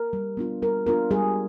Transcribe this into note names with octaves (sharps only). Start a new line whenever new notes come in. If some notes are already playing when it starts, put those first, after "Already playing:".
Already playing: A#4
G3
B3 D4 F4
G3 A#4
B3 D4 F4 A#4
G3 G#4